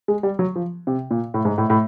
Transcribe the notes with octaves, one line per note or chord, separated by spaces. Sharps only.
G#3
G3
F#3
F3
C3
A#2
A2
G#2
A2
A2